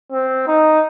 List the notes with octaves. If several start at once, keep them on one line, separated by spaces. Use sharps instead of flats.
C4
D#4